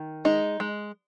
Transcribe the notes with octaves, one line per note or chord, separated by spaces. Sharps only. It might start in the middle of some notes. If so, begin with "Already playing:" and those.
Already playing: D#3
G#3 D#4
G#3